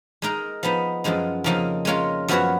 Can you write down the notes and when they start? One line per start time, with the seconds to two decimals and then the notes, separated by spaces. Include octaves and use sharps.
0.22 G#3 D#4 A#4
0.63 F3 B3 D#4
1.04 F#2 F3 G#3 D#4
1.44 F2 C#3 F3 A#3 D#4
1.85 G#3 C#4 F4 A#4 C#5
2.28 F#2 F3 B3 F#4 C#5